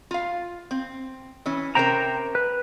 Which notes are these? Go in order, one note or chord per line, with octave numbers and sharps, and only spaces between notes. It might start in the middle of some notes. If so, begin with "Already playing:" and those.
F4 F5
C4
E3 C#4
C3 C#4 A#4 C5 G5 A#5
B4